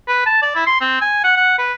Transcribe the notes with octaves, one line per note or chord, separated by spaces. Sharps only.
B4
A5
D5
E4
C6
C4
G#5
F#5
F#5
B4